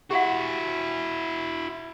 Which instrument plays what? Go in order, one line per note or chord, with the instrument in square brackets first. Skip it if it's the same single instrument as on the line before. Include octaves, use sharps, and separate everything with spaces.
[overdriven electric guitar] E4 F#4 [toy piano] G4 F#5